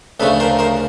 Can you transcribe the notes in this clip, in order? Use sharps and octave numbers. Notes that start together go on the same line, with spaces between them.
D2 C#3 F3 A3 A4 B4
A#4 C5
A#4 C5